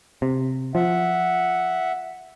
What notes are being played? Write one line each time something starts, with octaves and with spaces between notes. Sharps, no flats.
C3
F3 E5 F#5